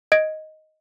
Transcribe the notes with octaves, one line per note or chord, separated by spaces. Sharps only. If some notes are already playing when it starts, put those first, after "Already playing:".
D#5 G#6 D7